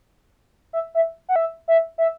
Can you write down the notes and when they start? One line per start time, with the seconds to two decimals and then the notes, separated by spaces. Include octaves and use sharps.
0.73 E5
0.95 E5
1.29 F#5
1.36 E5
1.68 E5
1.98 E5